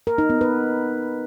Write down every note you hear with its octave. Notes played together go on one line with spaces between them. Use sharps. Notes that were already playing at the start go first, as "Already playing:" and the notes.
A#4
D#4
B3
B4